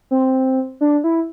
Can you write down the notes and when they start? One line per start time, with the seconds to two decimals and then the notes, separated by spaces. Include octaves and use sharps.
0.11 C4
0.81 D4
1.04 E4